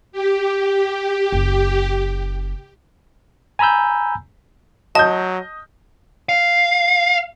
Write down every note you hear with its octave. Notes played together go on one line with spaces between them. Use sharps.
G4
F#1
G#5 A#5 B5 E6 G6
F#3 D#5 A5 G6
F5